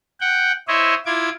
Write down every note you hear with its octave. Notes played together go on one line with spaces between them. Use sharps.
F#5 G5
E4 C5 C#5 D#5 E5
E4 F4 D6 G#6